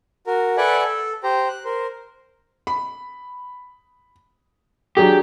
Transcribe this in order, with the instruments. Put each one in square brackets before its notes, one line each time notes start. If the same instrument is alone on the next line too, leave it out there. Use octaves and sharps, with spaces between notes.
[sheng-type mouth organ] F#4 A#4
A4 B4 D5 E5 F#5 G#5
A4
G4 C5 A#5
F#6
A#4 C5
[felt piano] B5
[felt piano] F#3 D4 G#4 [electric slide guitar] G4